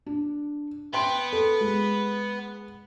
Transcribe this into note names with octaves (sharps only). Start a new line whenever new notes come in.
D4
B3 G5 C6 D7
A4
G#3